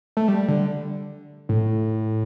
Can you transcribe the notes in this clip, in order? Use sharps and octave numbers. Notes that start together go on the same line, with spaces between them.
A3
G3
D3
A2